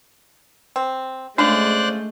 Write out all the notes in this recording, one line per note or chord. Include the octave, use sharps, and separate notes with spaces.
C4
C#3 G#3 A3 D4 F4 C5 D5 F#6